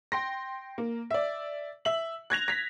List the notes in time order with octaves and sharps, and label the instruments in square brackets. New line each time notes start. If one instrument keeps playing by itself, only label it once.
[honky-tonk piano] G5 C6 A#6
A#3
D5 E5
E5 F#7
F#6 G#6 A#6 F7
A#6 B6